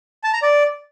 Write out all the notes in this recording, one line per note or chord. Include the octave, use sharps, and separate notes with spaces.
A5
A#5
D5